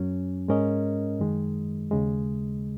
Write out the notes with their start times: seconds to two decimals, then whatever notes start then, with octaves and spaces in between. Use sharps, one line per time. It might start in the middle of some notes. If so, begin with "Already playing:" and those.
Already playing: F#2 F#3 C#4
0.48 G#2 G#3 C#4 A#4 D#5
1.19 F#2 D#3 G#3
1.91 D#2 C#3 G#3